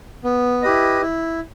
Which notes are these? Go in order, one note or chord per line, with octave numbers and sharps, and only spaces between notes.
B3
E4 G4 B4 D#5
E4